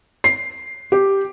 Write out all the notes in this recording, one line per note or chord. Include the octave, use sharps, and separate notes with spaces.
C7
G4